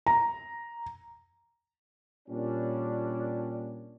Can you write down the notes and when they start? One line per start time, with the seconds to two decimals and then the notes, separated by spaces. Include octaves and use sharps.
0.07 A#5
2.29 A#2 G3 C#4 D4